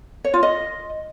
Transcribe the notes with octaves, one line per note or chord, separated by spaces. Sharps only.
C#5
F4
D#5